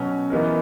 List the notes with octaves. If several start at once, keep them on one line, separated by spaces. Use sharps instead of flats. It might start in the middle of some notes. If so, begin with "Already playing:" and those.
Already playing: B2 F#3 C#4
E3 B3 D#4 A#4